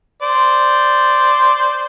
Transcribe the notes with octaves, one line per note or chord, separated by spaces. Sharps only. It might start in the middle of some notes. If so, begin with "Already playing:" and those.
C5 D5